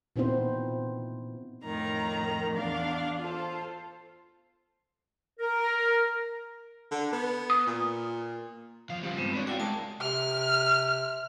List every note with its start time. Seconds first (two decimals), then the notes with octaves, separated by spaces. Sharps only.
0.16 A#2 B3 C4 D#4 E4 C5
1.64 F2 A2 D#3 A#5
2.54 E2 D4 F5
3.18 F4 A4 C5
5.40 A#4
6.91 D3
7.12 B3
7.50 D#6
7.66 A#2
8.90 E2 F3 F5
9.03 C#3 G3 F4 C5
9.17 G2 G#3 B3 C4
9.33 D4 B4 C#5
9.47 E4 F#4 A4 D5 F5 G5
9.60 G#3 E4 A#4 A5
10.01 C3 F6